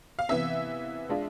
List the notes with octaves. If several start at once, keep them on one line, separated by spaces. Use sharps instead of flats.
F5
C3 E3 B3 E5
G#3 D4 F4